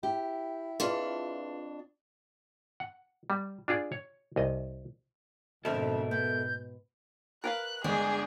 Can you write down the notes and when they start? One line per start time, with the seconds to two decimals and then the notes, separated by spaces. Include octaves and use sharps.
0.03 E4 G4
0.80 F2 D4 F4 G#4 B4
2.80 F#5
3.30 G3
3.68 D4 F4 G#4 D5
3.92 C#5
4.36 C2 D#5
5.65 F2 G#2 B2 D3 A4 A#4 E5
6.11 B3 G6
7.44 A#4 B4 F5 F#6
7.84 G1 G#3 D4 G#4